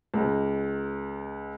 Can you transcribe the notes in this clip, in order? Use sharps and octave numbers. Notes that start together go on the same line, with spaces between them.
C#2